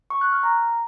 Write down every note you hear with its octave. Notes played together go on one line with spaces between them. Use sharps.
C#6
F#6
F6
A#5